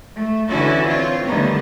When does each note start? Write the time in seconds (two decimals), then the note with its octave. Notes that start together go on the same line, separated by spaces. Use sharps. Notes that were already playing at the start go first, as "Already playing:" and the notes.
0.16 A3
0.49 D3 E3 C#4 E4 F#4 A4
0.87 C4 F4 C#5
1.26 D3 D#3 G3 A3 B3 D#4